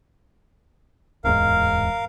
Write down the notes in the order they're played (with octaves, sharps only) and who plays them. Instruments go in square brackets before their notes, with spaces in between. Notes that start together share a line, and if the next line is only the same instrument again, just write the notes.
[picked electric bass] D1 E2 G#2 [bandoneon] A#4 F5